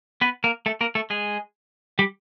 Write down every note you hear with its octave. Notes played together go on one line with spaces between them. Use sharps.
B3 B4
A#3 A#4
A3 A4
A#3 A#4
A3 A4
G#3 G#4
G3 G4